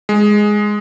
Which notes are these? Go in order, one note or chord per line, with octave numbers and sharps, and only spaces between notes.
G#3